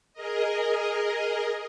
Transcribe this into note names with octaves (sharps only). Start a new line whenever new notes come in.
G#4 A#4 D#5